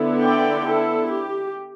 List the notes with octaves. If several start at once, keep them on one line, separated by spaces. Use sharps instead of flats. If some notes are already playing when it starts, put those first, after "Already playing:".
Already playing: D3 B3 E4
D5 G5
E4 A4
G4